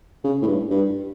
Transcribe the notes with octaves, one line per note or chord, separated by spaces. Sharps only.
C#3
A2
G2
G2